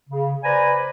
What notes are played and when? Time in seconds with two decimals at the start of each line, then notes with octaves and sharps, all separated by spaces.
0.10 C#3
0.44 B4 C5 D5 G#5 A#5 B5